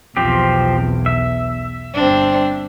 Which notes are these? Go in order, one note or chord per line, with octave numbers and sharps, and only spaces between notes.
B1 E2 F3 C4 G4
E5
G1 C4 D4